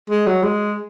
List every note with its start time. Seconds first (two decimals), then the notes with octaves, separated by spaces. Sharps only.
0.10 G#3
0.26 F#3
0.43 G#3